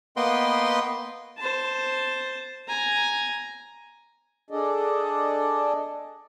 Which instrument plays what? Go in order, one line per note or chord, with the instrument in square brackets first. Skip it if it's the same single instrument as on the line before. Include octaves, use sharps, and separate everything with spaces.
[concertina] A#3 B3 B4 D#5 G5 C6
[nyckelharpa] C5 A5
G#5 A#5
[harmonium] D4 G#4 A4 D5 D#5